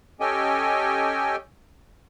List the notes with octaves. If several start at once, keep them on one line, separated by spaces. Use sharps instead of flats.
C#4 G4 A4 D#5 G5 G#5